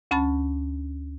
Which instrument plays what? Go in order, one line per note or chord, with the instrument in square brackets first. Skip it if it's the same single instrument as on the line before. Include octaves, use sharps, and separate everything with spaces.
[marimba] D2 C#4 A5 B5 A6